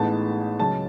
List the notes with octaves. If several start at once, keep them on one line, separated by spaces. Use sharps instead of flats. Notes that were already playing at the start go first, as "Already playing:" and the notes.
Already playing: A1 A2 G#3 B3 D#4 A5
C#2 C#3 F#3 C#4 A5